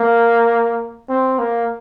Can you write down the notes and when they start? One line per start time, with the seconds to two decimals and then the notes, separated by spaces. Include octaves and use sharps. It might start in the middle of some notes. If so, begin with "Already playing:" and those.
Already playing: A#3
1.09 C4
1.39 A#3